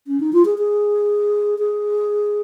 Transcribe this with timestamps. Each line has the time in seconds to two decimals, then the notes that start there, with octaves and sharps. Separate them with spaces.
0.07 C#4
0.20 D#4
0.33 F4
0.45 G#4
0.58 G#4
1.59 G#4